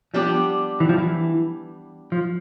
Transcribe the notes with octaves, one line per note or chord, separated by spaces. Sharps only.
F3 G3 B3 D4 G4
E3
F3
E3
F3